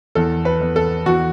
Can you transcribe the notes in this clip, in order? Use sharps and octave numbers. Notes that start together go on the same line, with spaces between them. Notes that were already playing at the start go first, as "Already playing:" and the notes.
E2 A4
B4
E2
A4
E2 F#4